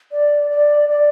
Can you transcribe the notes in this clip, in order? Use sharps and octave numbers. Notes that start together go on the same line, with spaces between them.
D5
D5
D5